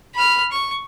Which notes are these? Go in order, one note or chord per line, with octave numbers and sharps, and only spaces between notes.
B5 F6
C#6